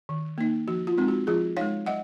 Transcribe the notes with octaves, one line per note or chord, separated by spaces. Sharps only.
D#3
A#3 D#4
F3 F#4
F4
G#3 C4 D#4
F#4
F3 F4 G#4
G#3 D#4 C#5 F5
F#3 D#5 F#5